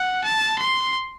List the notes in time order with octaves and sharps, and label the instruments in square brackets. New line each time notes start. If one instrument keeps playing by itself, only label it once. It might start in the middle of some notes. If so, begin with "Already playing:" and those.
Already playing: [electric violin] F#5
A5
C6